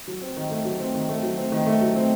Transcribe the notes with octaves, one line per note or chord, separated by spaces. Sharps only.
F#3
C4
D#3
A3
F#3
C4
D#3
A3
F#3
C4
D#3
A3
F#3
C4